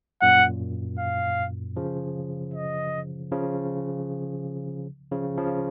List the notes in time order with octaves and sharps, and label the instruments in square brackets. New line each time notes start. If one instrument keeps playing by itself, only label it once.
[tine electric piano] F#2 A#2 [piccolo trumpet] F#5
[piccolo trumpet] F5
[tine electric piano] C#3 F3
[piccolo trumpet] D#5
[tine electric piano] C#3 F3
C#3 F3
C#3 F3